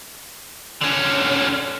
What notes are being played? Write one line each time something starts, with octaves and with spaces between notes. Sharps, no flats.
D3 C#4